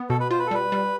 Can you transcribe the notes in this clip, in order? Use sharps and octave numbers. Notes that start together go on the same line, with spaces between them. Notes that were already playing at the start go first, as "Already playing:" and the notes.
Already playing: B3
B2 A4
B4
F4 C5
B4
A4
G3 B4
G3